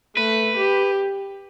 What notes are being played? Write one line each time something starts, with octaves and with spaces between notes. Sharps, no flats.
A3 B4
G4